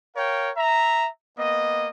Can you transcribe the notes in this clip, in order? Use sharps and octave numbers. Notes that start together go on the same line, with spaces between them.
A#4 C#5 F5 G5
E5 A#5
A#3 B3 D#5